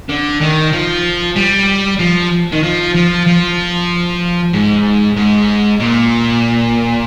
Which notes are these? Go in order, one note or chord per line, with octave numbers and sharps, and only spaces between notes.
D3
D#3
F3
G3
F3
D#3
F3
F3
F3
G#2
G#2
A#2